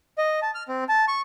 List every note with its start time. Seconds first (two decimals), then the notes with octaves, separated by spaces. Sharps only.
0.18 D#5
0.42 A5
0.55 F6
0.69 C4
0.89 A5
1.08 C#6